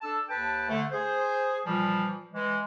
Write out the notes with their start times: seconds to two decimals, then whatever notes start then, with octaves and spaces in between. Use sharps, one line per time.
0.02 D4 A4 A5 E6
0.29 D#2 B4 G5 A5
0.69 D3 A3
0.92 G#4 C5
1.66 A#2 E3 F3 G3
2.33 E3 G#3